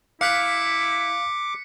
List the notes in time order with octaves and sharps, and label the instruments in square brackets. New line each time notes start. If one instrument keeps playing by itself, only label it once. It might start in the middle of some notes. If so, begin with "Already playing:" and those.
[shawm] E4 [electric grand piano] F5 F6 F#6 [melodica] D6 [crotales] B6 C#7